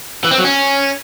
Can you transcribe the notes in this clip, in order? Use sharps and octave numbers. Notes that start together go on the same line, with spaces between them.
E3
C4
F#3
C#4